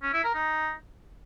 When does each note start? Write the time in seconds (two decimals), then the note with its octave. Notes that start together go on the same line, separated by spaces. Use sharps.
0.02 C#4
0.13 E4
0.24 A#4
0.35 D#4